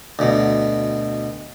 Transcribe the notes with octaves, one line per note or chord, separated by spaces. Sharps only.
D2 B2